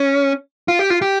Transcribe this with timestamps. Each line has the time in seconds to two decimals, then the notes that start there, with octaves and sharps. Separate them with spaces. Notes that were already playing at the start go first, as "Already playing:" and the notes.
Already playing: C#4
0.68 F4
0.79 G4
0.90 F4
1.02 G4